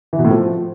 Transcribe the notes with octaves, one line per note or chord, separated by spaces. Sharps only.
E3
B2
A2
F3